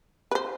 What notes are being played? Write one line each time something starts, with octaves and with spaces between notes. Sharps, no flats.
B4
C5